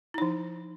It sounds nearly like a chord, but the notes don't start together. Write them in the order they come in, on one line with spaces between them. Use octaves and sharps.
E4 D#4 F3